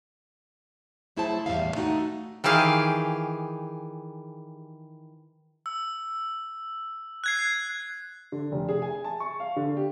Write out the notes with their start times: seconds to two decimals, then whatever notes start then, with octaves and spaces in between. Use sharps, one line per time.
1.16 F#3 A3 E4 G#4 C5 A5
1.46 E2 A2 G3 B3 E5 F5
1.74 G#3 A3 D#4 F#4
2.44 D#3 E3 G4 G#4 F5
5.66 E6
7.24 F#6 G#6 C7
8.32 D3
8.52 F1
8.69 G#4
8.82 G#5
9.04 A5
9.20 C#6
9.40 F5
9.56 D3
9.77 G4